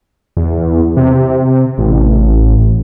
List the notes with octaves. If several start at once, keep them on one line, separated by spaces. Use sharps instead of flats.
E2
C3
A1